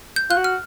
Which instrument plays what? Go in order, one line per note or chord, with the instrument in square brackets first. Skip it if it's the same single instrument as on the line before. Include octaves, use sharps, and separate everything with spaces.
[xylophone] G6
[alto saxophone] F4 [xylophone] F#6
[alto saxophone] F#4
[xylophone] F6